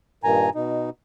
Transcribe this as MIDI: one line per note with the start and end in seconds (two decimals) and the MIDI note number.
0.24 0.50 43
0.24 0.50 46
0.24 0.50 51
0.24 0.50 80
0.24 0.50 82
0.55 0.90 47
0.55 0.90 63